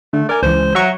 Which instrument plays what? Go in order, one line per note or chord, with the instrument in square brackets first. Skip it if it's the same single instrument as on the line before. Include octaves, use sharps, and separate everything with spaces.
[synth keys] D3 [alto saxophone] A3
[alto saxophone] A#4 [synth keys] D5 G#5
[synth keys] C#2 E3 [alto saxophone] C5
[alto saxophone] F#3 [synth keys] E5 A#5 C#6